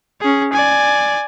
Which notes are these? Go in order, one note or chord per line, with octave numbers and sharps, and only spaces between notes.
C#4 G#4
D5 G#5